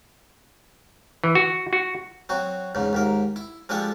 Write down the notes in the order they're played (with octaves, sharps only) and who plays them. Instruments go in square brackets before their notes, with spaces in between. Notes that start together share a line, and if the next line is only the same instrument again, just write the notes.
[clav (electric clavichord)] E3
F#4
F#4
[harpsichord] F#3 C4 F#4
E2 G#2 C#3
D#2 G#2 A#4
E4
F3 G3 G#3 D4 A4